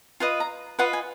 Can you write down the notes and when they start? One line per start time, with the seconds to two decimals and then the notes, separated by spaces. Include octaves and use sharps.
0.20 F4 B4 D#5
0.40 A#5
0.79 F4 B4 D#5 F#5
0.93 G#5